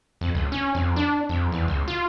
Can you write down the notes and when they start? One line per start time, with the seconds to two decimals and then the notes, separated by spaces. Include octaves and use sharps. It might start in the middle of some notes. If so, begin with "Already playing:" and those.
0.21 F2
0.35 C#2
0.52 C#4
0.75 F2
0.96 D4
1.29 F2
1.52 E2
1.68 C#2
1.88 F4